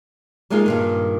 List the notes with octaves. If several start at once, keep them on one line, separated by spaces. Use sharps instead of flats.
G3 G#3 A#3 D#4 F4 G#4
G2 A#2 D#3